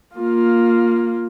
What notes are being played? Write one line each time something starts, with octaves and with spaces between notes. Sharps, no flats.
A#3 F4